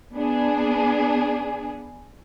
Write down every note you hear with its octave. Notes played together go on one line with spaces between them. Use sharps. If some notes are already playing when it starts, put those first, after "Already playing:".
B3 D4 G#4